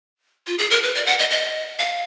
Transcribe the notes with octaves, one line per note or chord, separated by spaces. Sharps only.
F4
G#4
A#4
B4
D5
F#5
D#5
D#5
F5